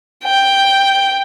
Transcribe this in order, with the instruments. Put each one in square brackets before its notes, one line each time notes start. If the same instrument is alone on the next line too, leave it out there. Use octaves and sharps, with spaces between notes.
[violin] G5